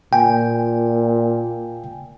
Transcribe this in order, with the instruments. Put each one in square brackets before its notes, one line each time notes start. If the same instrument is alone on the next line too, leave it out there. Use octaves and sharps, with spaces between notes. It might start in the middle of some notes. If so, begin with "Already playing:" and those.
[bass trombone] A#2 [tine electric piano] G5 G#5